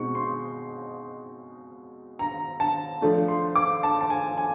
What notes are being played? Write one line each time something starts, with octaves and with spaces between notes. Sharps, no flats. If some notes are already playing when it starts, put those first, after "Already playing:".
Already playing: B2 G#3 C4 D#4 C#6
C6
A#5
A5
F3 A3 D4
C6
D6
A5
A5
G#5
G#5